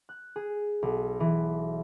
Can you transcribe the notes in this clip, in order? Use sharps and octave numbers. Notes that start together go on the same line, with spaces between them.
F#6
G#4
B1
E3